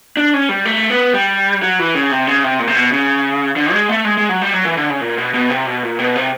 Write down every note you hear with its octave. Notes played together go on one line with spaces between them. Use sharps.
D4
C#4
G3
A3
B3
G3
F#3
E3
C#3
C3
C#3
C3
A#2
C3
B2
C#3
D3
G#3
A3
G#3
G#3
F#3
G3
F#3
E3
D3
C#3
A#2
B2
B2
C3
B2
A#2
B2
C3